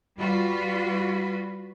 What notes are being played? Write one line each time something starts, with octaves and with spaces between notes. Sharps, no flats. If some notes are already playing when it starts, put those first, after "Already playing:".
G3 F4 F#4 B4